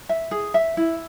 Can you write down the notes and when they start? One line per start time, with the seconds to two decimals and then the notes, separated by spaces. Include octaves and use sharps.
0.09 E5
0.31 G#4
0.54 E5
0.77 E4